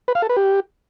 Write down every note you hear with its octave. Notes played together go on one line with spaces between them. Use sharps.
B4
F5
A4
B4
G4